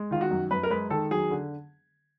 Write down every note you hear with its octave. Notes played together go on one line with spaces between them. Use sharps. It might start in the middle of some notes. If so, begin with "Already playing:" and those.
Already playing: G#3
D#3 F4
F#4
F#2
F#2 B4
A#4
G#3 B4
D#3 A4
F#3 G#4
D3